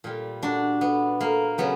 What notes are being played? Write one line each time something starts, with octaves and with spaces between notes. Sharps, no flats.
A#2 G3
D4 F#4
B3
A#3
C#3 F#3 B3